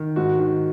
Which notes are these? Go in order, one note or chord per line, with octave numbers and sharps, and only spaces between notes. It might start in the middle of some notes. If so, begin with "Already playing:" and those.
Already playing: D#3
G#2 F#4
D#3